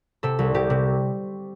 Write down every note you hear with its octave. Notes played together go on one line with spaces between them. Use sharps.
C3 A4
C2
C3 G4
C3